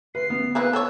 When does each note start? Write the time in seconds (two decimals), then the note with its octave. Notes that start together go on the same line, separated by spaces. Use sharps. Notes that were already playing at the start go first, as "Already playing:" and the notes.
0.15 D2 B4 C7
0.30 B3
0.55 A#3 C4 E4 G#4 B4 F#6
0.73 A4 C5 C#5 E6